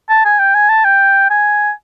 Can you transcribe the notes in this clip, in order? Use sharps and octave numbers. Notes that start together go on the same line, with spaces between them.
A5
G#5
G5
G#5
A5
G5
G#5